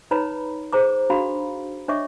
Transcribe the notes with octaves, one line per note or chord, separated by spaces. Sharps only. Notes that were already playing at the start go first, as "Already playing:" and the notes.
D#4 B4 C#5 A#5 B5
G#4 C5 A#5 D6
D4 F#4 F5 A#5 B5
D4 C#5 D#5 E5 C#6 D6